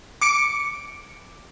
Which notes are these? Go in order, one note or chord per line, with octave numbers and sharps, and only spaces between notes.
D6 C#7 D7